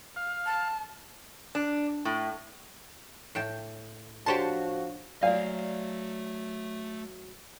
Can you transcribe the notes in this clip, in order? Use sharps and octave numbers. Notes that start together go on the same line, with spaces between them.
F5
A5
D4
A2
A2 G5 A5
D3 F3 F#4 G4 C5 C#5 A5
F#3 A3 D5 F5 G#5